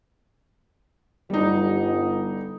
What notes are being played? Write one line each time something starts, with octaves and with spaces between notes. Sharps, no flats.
G1 G3 D#4